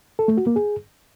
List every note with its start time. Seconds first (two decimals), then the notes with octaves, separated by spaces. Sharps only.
0.19 A4
0.28 A3
0.37 F#4
0.47 A#3
0.56 G#4